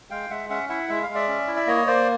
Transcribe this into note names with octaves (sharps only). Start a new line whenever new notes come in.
G#3 F5 G5
G#3 E5 F#5
C#4 E5 F#5
E4 E5 F#5
G#3 E5
F5
G#3
D5 E5
C#4
E4
E5
A#3 C#5 D#5
A#3 C5 D5